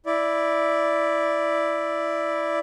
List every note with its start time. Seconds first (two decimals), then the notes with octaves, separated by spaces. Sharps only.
0.06 E4 D5